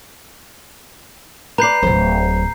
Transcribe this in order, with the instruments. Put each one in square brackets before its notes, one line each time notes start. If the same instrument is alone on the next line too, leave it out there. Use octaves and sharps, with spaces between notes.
[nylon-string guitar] B4 D5 [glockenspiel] A#5 G6 C7
[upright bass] D1 F#3 [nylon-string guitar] C5